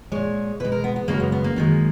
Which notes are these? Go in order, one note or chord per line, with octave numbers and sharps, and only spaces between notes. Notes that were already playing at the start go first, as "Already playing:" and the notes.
A#2 G#3 C#5
B2 G#3 B4
A#4
B3
B3
F#2 C#3 G#3 A#3
B3
B3
A#3
F#2 D#3 G#3